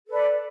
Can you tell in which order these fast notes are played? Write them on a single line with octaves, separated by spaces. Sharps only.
A4 B4 D5